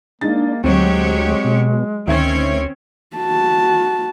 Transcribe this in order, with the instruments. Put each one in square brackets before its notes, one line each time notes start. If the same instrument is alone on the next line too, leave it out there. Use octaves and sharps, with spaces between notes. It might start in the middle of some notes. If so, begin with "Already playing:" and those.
[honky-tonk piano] G#3 D#4 A6 [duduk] A#3 [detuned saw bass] D4
[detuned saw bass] D2 [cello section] F#3 G4 C#5 [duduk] G#3 [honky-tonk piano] C4 C5
[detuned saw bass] B2
[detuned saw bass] D2 [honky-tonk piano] D#3 E5 G#6 [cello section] C4 C#4 C#5
[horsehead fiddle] F#4 A5